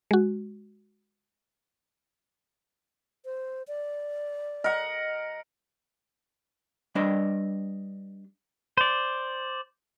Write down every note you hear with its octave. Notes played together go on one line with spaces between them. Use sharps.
G#3 F#4
C5
D5
A#4 D#5 F#5
G3 D4 B4 D5 D#5
C5 D5